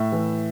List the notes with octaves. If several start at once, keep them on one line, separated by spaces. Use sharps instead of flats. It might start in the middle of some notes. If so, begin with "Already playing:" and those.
Already playing: A2 E5
E3